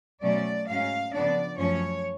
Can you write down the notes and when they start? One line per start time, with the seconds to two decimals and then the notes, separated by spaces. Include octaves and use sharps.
0.22 B2 F#3 A3 C#4 D5
0.67 G#2 F#3 C#4 F5
1.13 C#3 F3 B3 D4 D5
1.58 F#2 F3 A3 C#4 C#5